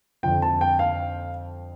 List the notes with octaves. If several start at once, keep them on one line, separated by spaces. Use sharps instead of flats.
F2 D3 F3 G5
A5
G5
F5